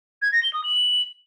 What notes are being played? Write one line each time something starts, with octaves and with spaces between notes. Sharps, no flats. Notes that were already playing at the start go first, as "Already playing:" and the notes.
G#6
A#6
G7
D#6
F#7